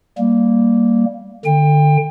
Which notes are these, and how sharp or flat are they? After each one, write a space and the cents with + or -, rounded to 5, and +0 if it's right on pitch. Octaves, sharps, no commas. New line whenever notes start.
G3 -5 A#3 +0
D3 +20 G5 +30